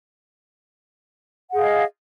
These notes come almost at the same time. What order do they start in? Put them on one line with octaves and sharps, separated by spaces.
F#5 G#4 F5 D#5